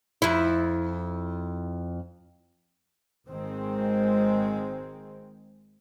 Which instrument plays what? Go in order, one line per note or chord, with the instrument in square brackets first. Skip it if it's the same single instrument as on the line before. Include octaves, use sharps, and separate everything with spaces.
[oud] F2 E4
[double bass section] G#1 D#3 G#3 C4